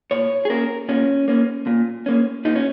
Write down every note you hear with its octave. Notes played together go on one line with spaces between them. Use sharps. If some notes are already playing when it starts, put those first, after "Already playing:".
A#2 C#5
G#4
A#3 C#4 A#4
A#2 C#4
A#3 C#4
A#2
A#3 C#4
A#2 D#4
C#4